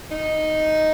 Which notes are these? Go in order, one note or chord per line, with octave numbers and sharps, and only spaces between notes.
D#4